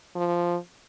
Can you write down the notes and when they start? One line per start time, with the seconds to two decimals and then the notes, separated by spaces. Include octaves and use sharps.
0.15 F3